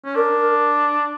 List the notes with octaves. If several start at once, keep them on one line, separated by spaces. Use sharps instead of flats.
C#4
D4 A#4